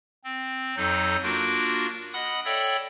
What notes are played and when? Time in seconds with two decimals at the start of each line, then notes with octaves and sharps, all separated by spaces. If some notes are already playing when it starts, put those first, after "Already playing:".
0.24 C4
0.77 F2 F#3 D#4 A4 G6
1.23 A#3 D4 F4 F#4 A#4
2.13 D#5 F#5 B5 D#6 F6
2.45 A4 C#5 D5 E5 G5 B5